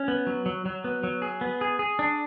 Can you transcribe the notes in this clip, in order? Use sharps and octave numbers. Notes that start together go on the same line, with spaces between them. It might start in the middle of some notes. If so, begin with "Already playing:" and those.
Already playing: C#4
B3
F#3
F#3
F#3
B3
F#3
G#4
B3
G#4
G#4
D4